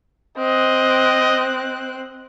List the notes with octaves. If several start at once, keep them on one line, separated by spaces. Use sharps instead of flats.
C4 D#5 F#6